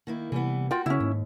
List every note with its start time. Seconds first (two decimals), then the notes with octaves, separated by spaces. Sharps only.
0.07 D#3 A#3 E4
0.32 C3 E3 G3 B3
0.71 F4 F#4 A#4 G5
0.86 C#3 C#4 E4
1.00 D#2 G#2